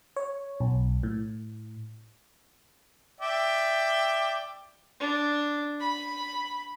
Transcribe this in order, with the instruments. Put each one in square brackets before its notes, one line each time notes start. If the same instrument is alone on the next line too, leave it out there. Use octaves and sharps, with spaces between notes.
[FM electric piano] C#5
B1
A2
[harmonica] D5 E5 G5
[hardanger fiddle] D4
B5